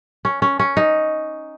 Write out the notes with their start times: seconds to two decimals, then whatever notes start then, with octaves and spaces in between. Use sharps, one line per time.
0.25 C#4
0.42 C#4
0.59 C#4
0.77 D#4